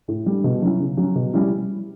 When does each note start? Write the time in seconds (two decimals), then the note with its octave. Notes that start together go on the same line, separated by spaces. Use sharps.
0.08 A2
0.26 G3 D4
0.44 B2
0.62 F#3 C#4 E4
0.80 C#3
0.97 F#3 C#4
1.15 B2
1.33 G3 C#4 E4